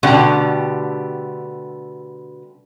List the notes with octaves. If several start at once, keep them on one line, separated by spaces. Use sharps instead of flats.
B2 D3 G3 A3 G4